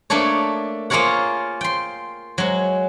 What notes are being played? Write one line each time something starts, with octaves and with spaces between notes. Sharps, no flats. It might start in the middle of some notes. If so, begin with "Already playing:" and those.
A3 A#3 D4 A4 C#5
A#3 F4 G#4 A#4 C#5 F#5
G5 C6
F#3 G#3